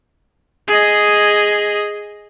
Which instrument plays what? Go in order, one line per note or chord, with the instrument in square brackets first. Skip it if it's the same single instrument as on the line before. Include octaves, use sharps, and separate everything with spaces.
[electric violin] G#4 D#5